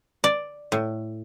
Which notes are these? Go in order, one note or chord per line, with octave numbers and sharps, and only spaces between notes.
D5
A2